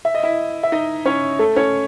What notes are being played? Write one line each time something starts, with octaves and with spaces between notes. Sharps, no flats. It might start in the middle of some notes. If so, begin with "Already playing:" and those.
E5
D#5
E4 E5
E5
D#4 D#5
C#4 C#5
A3 A4
C#4 C#5